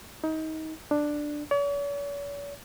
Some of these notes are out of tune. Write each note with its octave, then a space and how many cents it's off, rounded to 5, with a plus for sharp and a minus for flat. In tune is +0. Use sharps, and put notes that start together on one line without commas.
D#4 +25
D4 +10
C#5 +45